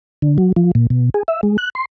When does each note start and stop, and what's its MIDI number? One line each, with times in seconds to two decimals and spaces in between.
0.22 0.37 50
0.38 0.52 54
0.56 0.71 53
0.75 0.87 46
0.90 1.10 47
1.14 1.23 68
1.28 1.41 76
1.43 1.57 56
1.58 1.70 90
1.75 1.85 84